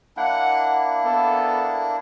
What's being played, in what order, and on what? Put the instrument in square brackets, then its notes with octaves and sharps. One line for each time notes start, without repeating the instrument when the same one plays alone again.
[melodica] A#3 D4 E4 [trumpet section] F#5
[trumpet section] B3 A4